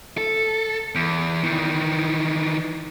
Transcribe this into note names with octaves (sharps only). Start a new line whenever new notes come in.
A4
E2
D#3 E3